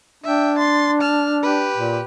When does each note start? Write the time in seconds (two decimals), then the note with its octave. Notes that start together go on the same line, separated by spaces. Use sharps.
0.24 D4 E5 G5
0.58 C6 A6
1.01 A5 F6
1.43 G4 B4
1.76 A#2